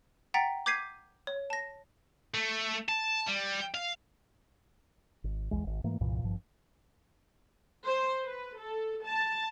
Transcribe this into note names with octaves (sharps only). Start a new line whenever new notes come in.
F#5 G5 A#5 A6 B6
D6 G6 G#6 B6 C7 D#7
C#5
A5 A#6
A3
A5
G3
F5
G#1
A#1 E2 G#3
D1 G#1
G#2 E3 A3 A#3
C2 G2 A#2 E3
G#1 G2 F3
C5
B4
A4
A5